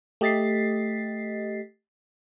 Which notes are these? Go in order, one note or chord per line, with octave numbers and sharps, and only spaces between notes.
A3 G4 D#5 A6 B6 C7